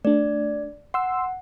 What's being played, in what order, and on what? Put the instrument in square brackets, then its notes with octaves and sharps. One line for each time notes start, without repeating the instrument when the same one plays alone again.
[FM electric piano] A3 D4 [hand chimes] D5
[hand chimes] F#5 [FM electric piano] C6 E6